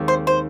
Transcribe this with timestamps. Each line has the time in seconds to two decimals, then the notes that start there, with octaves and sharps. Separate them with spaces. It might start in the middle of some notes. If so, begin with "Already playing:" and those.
Already playing: D#2 G#3 C4
0.08 C5
0.27 C5